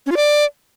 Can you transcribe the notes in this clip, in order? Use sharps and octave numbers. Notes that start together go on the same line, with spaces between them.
C#4
F4
D5